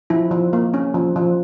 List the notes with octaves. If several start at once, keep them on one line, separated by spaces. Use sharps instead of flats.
F3 E4
F3
A#3
C#4
F3
F3